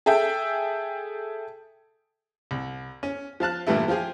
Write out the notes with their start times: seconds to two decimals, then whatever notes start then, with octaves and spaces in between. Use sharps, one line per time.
0.06 G#4 A4 E5 G5
2.51 C2
3.03 C#4
3.40 F3 F5 A5 F#6
3.67 G2 A#2 E3 G3 A3 E4
3.88 F3 F4 G4 G#4